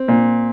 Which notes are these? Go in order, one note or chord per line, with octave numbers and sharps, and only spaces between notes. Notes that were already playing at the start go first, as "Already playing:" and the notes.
Already playing: C4
A#2